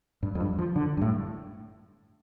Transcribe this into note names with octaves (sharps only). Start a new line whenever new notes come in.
G2
F2
G2
F3
D3
G2
A2